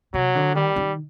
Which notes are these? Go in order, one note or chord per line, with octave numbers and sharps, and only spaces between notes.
C3 F#3
D3
D#3 G3
D#3